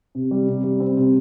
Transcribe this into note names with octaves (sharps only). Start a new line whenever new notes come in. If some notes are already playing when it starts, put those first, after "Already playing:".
C3
G3
C3
G3
C4
C3